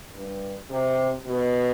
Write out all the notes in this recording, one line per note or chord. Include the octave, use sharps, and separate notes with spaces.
G2
C3
B2